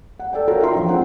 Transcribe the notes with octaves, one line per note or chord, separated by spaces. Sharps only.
F#5
A4 D5 G5
F4 F#4 A4 A#4 C#5 G5
D4 D#4 E5 G5 A#5 C6
F3 F4
G#3 C4 F#5 G5